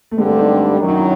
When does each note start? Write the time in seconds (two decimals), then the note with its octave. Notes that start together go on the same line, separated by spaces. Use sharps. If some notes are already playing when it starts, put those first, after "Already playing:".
0.11 A3
0.17 G2 D3 G3 G#3 C4
0.28 A3
0.38 D#4
0.78 F#2 D#3 F#3 D4
0.89 D#4
0.98 E4